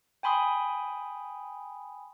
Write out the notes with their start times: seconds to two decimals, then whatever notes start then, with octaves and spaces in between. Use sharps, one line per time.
0.23 G5 G#5 B5 C6 D#6